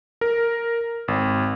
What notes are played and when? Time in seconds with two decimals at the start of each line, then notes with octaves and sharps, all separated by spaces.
0.21 A#4
1.08 G#1